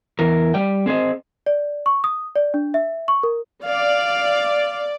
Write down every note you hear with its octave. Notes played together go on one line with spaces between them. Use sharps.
E2 E3 A#4
G3 D5 G5
C4 G#4 C5 D#5
D5
C#6
D#6
D5
D4
E5
C#6
A#4
D5 F5